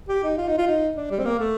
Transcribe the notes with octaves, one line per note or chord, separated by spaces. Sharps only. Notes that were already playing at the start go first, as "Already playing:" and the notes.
G4
D#4
F4
D#4
F4
D#4
D4
G3
C4
A#3
A3